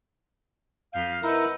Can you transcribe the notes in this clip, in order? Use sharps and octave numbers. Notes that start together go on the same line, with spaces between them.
F2 F5 G6
D#4 E4 A#4 B4 F#5 E6